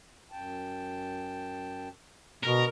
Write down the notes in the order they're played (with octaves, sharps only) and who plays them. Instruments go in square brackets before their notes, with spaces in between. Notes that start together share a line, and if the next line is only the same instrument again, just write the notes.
[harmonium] F#2 G5 A5
[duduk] B2 [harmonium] D3 [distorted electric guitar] A#4